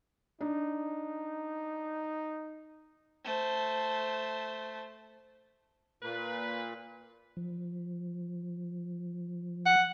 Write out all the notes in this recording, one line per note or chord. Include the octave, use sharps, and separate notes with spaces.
D4 D#4
A3 C5
A#2 A#3 B4
F3
F#5